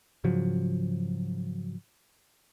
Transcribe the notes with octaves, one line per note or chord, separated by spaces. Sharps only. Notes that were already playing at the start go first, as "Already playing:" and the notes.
G#2 C#3 F3 F#3